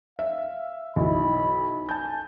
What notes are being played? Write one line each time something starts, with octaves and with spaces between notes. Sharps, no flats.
E5 F5
B1 E4 B5
G#5 A5 G6